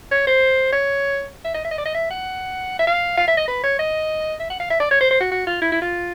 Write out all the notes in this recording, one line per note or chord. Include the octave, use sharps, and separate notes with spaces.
C#5
C5
C#5
E5
D#5
E5
D#5
D5
D#5
E5
F#5
E5
F5
F5
E5
D#5
B4
C#5
D#5
E5
F#5
F5
E5
D5
C#5
C5
C5
F#4
F#4
F4
E4
E4
F4